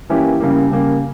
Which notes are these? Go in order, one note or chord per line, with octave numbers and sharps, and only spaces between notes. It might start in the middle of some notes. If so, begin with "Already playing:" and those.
E3 A#3 C#4 E4 G4
C#3 G3 A#3
C#3 G3 A#3